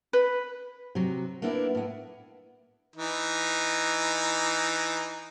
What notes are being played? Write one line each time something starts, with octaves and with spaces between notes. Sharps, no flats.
B4
C3 F#3
A#3 B3 D4 E4
A2 B3
E3 D#4